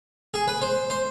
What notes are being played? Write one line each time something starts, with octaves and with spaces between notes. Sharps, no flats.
G#4
B4
C5
C5